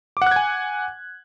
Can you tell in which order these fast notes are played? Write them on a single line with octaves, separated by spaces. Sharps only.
D6 F#5 F#6 G#6 G#5